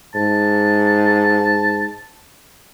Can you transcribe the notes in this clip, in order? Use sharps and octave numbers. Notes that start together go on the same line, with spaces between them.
G#2 A5